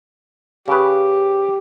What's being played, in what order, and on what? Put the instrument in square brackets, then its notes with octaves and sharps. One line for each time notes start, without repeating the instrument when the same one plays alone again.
[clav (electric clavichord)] C#3 B4 [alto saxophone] G4